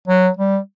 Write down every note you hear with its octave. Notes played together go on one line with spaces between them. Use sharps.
F#3
G3